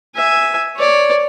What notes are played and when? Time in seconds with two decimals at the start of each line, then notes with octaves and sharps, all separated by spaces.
0.15 E5 G#5
0.77 C#5 D5